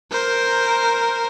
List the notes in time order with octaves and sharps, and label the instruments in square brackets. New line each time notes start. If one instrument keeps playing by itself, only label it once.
[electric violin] A#4 C5